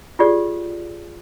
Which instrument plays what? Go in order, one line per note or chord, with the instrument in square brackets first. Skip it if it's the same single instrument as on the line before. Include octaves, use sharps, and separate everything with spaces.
[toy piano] F4 G4 G#4 D5